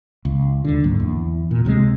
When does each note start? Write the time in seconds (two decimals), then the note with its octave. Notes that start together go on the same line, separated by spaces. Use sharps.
0.25 C#2
0.65 D#2 D3
0.84 C#2 G#2 F#3 A#3
1.00 E2
1.51 A#2
1.65 C#2 C3 F3 G#3